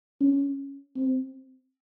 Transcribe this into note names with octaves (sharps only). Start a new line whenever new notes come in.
C#4
C4